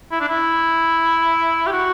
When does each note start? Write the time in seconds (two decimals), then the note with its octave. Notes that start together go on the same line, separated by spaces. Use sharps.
0.12 E4
0.21 D4
0.29 E4
1.67 G4
1.72 F#4